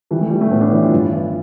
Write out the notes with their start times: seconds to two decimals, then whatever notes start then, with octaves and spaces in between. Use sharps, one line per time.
0.11 E3 G3
0.21 A3
0.31 E3 G3
0.41 A3
0.51 A2 B3
0.61 D4
0.71 E3 E4
0.78 G4
0.83 F4
0.92 G2
1.13 E3